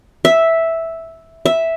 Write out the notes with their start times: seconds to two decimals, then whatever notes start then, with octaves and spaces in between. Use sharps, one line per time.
0.25 E5
1.46 E5